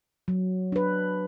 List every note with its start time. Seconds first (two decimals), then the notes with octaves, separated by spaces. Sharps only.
0.28 F#3
0.72 D4 B4